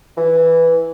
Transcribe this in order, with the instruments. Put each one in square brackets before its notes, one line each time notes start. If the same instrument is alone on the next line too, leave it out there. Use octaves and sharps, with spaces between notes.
[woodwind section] E3